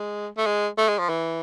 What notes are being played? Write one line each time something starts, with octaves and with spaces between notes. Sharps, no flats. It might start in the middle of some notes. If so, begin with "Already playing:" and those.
Already playing: G#3
A3
G#3
A3
G#3
F3
E3